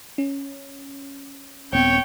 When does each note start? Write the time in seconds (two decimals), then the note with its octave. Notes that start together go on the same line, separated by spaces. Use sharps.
0.18 C#4
1.73 D#1 B3 C4 C#5 G5